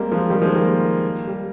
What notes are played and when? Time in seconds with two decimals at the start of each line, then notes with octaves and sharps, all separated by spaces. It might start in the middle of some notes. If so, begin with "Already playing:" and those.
Already playing: G3 G#3 A#3 C4
0.12 F3 G#3
0.30 D#3 G3
0.42 F3 G#3
0.54 G3 A#3
1.27 G3